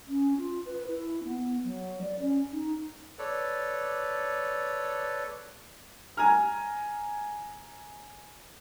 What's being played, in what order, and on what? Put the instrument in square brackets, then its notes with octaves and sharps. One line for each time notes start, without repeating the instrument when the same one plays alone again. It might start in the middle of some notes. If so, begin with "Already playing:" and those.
[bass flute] C#4
F4
B4
E4
B3
F#3
D5
C#4
D#4
[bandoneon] A4 B4 C#5 D5
[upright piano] G#5 A#5 F6